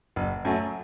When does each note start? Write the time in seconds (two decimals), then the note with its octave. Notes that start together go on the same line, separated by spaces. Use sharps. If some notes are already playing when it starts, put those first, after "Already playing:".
0.16 F#1
0.45 F#2 F#3 A3